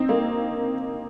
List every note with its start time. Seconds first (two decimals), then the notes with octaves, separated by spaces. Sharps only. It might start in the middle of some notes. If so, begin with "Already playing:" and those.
Already playing: C4 D#4
0.09 A#3